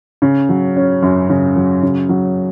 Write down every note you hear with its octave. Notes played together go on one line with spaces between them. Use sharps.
C#3
F#3
C#4
F#2
C#3
F#3
C#3
F#3